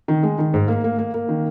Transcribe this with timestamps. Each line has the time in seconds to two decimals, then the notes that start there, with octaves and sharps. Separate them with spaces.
0.08 D#3
0.23 G#3
0.39 D#3
0.54 G#2
0.68 A#3
0.84 A#3
0.98 A#3
1.14 A#3
1.29 D#3